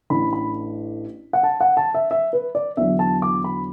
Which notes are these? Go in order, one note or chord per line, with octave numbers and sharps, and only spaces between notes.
A1 A2 A3 D4 B5
B5
F#5
A5
F#5
A5
E5
E5
B4
D5
E2 D3 F#3 E5
A5
D6
B5